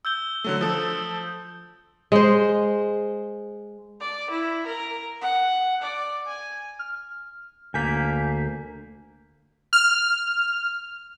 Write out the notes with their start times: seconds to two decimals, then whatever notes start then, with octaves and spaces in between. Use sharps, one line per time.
0.05 E6 G6 G7
0.44 D3 F#3 A3
0.61 F3 A4 D#6 E6
2.12 G#3 C5
4.00 D5
4.30 E4
4.66 A#4
5.21 F#5
5.82 D5
6.26 G#5
6.79 F6
7.74 D2 A#3 G#5 G6 B6
9.73 F6